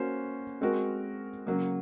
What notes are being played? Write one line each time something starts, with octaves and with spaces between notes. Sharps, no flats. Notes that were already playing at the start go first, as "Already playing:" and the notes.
Already playing: A#3 C#4 F#4 C5
G#3 C4 F#4 A#4
C#3 F#3 A#3